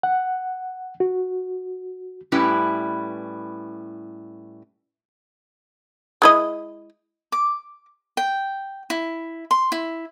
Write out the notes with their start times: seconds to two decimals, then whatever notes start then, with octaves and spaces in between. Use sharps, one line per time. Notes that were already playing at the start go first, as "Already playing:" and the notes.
0.03 F#5
1.00 F#4
2.32 A2 G3 C#4 E4 B4
6.22 G#3 E4 D#5
7.32 D6
8.17 G5
8.90 E4
9.51 C6
9.72 E4